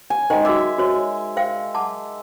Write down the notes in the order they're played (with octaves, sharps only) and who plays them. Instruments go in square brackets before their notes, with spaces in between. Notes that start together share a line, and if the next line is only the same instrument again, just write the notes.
[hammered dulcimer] G#5
[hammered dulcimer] D#3 G#3 [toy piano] C5 D#5
[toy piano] F#4 D#5 D6 [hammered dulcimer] E5
[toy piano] F#4 C5 C#5
C5 F5 G5
F#5 A5 D6